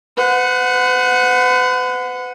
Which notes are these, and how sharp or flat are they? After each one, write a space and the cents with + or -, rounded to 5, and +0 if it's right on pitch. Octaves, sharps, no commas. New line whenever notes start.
B4 +45 F#5 -10